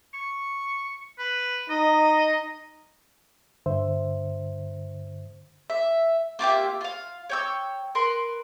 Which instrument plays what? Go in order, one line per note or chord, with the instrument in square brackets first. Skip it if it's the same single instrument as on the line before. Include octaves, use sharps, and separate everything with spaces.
[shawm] C#6
B4
[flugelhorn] D#4 [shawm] D#5
[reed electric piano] G2 D3 C5 E5
[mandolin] E5
A#3 F4 G4 E5
F4 F5
C#5 G5 E6
A#4 B4 C6